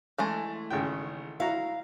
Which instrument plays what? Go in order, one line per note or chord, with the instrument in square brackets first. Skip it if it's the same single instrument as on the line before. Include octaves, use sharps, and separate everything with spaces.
[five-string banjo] E3 G#3 A3
[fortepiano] G#1 C#3 G5
[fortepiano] E4 F#4 A#5 [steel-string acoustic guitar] F5